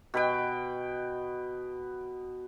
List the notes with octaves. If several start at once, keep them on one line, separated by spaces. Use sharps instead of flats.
B2 B4 G5